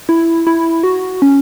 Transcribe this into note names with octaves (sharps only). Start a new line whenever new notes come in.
E4
E4
F#4
C#4